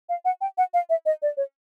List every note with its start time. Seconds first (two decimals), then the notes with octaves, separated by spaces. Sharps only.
0.09 F5
0.25 F#5
0.41 G5
0.58 F#5
0.74 F5
0.90 E5
1.06 D#5
1.22 D5
1.37 C#5